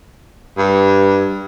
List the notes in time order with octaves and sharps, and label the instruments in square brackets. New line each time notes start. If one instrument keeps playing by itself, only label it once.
[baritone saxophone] G2